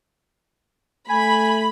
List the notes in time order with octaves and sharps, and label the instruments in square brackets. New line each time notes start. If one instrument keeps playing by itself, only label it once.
[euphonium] A3 [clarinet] G#5 [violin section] B5